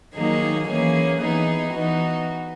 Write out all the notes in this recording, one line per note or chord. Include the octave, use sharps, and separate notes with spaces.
D#3 F#3 A#3 D#4 G#4
E3 A#3 C#4 G#4
E3 B3 D#4 G#4
E3 B3 D#4 F#4